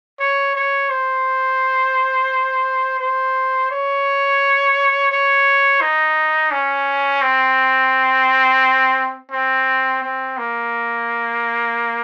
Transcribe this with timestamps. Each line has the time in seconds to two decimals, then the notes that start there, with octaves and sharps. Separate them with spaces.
0.20 C#5
0.55 C#5
0.90 C5
3.00 C5
3.71 C#5
5.12 C#5
5.81 D#4
6.51 C#4
7.21 C4
9.32 C4
10.03 C4
10.38 A#3